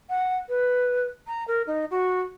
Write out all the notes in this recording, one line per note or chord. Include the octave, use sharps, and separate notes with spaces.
F#5
B4
A#5
A#4
D#4
F#4